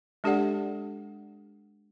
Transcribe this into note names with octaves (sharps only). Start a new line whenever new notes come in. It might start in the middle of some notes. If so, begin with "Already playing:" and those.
G#3 D4 G4 A4 D5 F#5